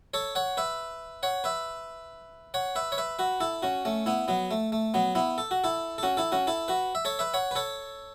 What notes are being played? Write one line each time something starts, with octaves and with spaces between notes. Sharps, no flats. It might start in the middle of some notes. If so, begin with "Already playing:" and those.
A4 C#5
C#5 F#5
B4 E5
C#5 F#5
B4 E5
C#5 F#5
B4 E5
C#5
B4 E5
F#4 B4
E4 A4
C#4 F#4
A3 C#4
B3 E4
F#3 B3
A3
A3
F#3 B3
B3 E4
A4
F#4
E4 A4
A4
C#4 F#4
E4 A4
C#4 F#4
E4 A4
F#4 B4
E5
A4 C#5
B4 E5
C#5 F#5
B4
A4 C#5